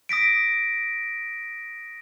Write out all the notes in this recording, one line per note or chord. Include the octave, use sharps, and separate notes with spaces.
D#6 A#6 B6 D7